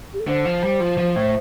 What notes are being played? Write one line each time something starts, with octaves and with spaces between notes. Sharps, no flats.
G4
A4
D3 C5
F3
G3
F3
F3
A2